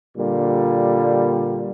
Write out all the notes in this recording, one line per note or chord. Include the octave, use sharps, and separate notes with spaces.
A#2 D3 G3